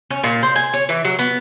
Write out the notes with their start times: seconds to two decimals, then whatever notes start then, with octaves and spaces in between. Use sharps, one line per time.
0.10 C#4
0.24 A#2
0.43 C5
0.56 G#5
0.74 C#5
0.89 E3
1.05 F#3
1.19 B3